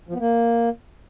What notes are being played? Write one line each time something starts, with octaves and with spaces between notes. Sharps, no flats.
F3
B3
A#3